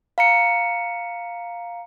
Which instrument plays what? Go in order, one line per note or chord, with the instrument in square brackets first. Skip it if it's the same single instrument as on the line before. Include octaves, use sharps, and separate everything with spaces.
[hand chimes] F5 A#5 C#7